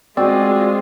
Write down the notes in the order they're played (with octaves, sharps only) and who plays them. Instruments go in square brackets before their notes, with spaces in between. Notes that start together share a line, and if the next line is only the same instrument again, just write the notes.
[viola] G#3 F4 [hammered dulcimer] C4 [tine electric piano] F#4 D5